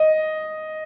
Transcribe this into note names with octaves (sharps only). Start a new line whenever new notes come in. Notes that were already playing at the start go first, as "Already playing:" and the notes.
Already playing: D#5